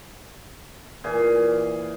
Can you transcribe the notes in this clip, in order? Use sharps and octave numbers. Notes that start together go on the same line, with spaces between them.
A#2 E3 G#4